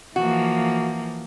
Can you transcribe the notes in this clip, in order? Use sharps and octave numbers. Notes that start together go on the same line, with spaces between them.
E3 F3 A#3 F#4